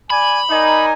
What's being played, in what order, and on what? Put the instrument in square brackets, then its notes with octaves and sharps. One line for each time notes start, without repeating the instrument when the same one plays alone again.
[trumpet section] D5 G#5 [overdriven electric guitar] B5
[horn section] D#4 [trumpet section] A#4 D5 G#5